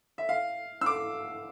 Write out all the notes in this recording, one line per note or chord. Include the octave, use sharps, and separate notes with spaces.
E5
F5
E6
D6